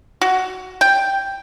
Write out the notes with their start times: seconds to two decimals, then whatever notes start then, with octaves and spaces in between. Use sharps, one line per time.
0.21 F#4
0.81 G5